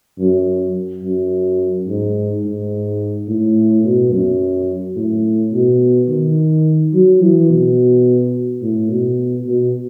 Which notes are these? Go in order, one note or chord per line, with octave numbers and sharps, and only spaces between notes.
F#2
F#2
G#2
G#2
A2
B2
F#2
A2
B2
D#3
F#3
E3
B2
A2
B2
B2